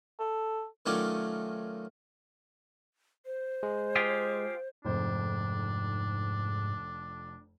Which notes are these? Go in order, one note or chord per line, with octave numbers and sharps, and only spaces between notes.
A4
D#3 F#3 A3 C#4 F4 D5
C5
G#3
F4 G4 G#4
F1 F2 G#2 D4 C5